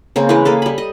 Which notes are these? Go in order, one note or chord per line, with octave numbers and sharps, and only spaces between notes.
C#3 A#3 C4
E3 G#3 A#4 B4
A#3 G#4 A4
G3 B5
D#5